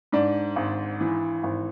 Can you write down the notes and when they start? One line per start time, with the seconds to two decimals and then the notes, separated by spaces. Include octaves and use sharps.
0.12 G#2 D4
0.56 G#1
1.01 E3
1.43 G#1